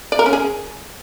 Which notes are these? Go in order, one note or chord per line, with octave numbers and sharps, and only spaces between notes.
D5
A#4
C#4
G#4